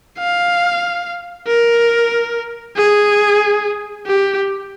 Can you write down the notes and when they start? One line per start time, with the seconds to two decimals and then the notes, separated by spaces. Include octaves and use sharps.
0.18 F5
1.48 A#4
2.77 G#4
4.06 G4